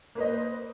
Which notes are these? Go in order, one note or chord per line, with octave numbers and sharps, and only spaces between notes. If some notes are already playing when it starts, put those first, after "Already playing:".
A#3 B4 C5 D#5